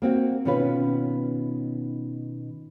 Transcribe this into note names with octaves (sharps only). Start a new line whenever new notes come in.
A#3 C4 F#4
B2 D#3 C#4 F4 B4